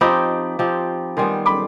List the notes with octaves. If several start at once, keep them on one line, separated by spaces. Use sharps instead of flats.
F3 C4 D#4 G4 B5 D6
F3 C4 D#4 G4
D#3 G3 B3 G#5 C6
B5 D6